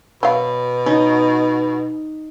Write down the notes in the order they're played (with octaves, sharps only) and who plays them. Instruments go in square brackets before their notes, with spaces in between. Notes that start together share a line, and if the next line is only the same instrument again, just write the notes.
[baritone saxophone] B2 [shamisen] F#3 F5
[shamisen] C#4 [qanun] D#4